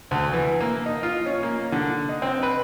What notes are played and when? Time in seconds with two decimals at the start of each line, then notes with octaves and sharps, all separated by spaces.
0.11 D2
0.33 E3
0.60 A#3
0.86 D#4
1.03 F4
1.26 C#4
1.43 A#3
1.72 D3
2.09 D#4
2.22 C4
2.43 B4